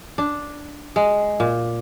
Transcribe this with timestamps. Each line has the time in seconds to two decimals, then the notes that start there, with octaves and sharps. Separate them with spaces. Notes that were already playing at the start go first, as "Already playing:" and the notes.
0.18 D4
0.96 G#3
1.40 A#2